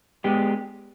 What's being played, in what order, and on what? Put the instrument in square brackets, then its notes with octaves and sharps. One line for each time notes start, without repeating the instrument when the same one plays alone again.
[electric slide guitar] G#3 B3 D4 G4